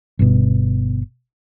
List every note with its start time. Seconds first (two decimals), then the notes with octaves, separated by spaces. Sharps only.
0.19 G1 B2